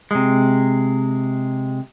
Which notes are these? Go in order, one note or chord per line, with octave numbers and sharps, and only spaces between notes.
C3 G#3